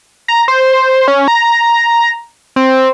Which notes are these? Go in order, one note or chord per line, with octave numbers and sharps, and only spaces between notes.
A#5
C5
C#4
A#5
C4